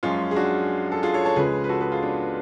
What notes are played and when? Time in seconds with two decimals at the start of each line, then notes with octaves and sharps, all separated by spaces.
0.03 F#2 F3 G#3 C#4 F4
0.31 G#4
0.36 D4 F#4
0.92 A4
1.03 F4 G#4
1.13 A4 C#5
1.25 A4 C#5
1.36 C#2 C#3 F3 G#3 G#4 B4
1.64 B4
1.69 F#4 A4
1.81 G#4 B4
1.92 F4 G#4
2.03 B3 D4